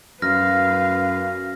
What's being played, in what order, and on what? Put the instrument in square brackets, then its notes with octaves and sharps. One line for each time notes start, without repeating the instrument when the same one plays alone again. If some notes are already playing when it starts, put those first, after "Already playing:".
[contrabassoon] F#2 [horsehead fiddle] B4 F5 [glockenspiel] F6 A#6